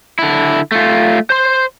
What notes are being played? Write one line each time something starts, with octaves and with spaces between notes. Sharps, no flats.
D3 E4
A3 F4
C5 C6